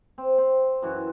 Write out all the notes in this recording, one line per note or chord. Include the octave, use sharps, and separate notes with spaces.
C4
C4
F#2 E3 F#4